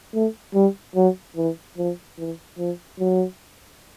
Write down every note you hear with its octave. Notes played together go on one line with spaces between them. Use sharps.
A3
G3
F#3
E3
F3
E3
F3
F#3